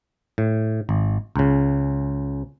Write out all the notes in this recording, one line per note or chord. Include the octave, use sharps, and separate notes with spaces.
A2
G#1
C#2 C#3